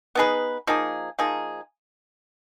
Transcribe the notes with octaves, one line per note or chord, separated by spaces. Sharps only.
B3 D#4 G#4 B4
F3 A#3 D#4 G#4
F3 A#3 D#4 G#4